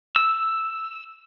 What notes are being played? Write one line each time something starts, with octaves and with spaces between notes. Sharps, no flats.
E6